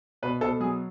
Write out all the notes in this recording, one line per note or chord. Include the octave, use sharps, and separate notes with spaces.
B2 B4
B2 A4
F#3 G#4